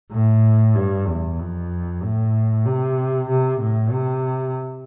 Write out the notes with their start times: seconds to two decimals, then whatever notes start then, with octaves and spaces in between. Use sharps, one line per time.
0.12 A2
0.75 G2
1.07 E2
1.39 F2
2.03 A2
2.66 C3
3.29 C3
3.60 A2
3.92 C3